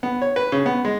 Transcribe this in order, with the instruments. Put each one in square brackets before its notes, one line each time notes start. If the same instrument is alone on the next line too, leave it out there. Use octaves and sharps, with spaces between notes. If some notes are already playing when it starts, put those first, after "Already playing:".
[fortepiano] B3
C#5
B4
C#3
B3
G#3